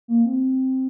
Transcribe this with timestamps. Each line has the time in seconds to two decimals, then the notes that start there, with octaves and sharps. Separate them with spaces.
0.08 A#3
0.25 C4